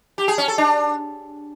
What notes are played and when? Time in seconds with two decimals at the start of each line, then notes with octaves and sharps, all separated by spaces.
0.18 G4
0.28 G#4
0.38 C#4
0.48 A4
0.58 D4